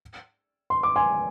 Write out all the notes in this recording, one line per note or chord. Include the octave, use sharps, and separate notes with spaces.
C6
D6
G#5 C6